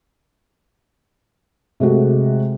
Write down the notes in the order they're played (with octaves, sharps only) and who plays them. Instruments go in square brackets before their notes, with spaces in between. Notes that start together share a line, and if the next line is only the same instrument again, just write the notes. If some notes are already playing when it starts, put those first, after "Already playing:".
[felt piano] C3 G#3 A3 F#4